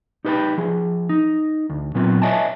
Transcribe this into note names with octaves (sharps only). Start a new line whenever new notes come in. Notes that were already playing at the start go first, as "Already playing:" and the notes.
D#4 G4 B4 C#5 G5 B5
F3 G#4
D#4
D2
A#2 F#3 B3 C4 F4
B4 C#5 D#5 E5 G#5 A5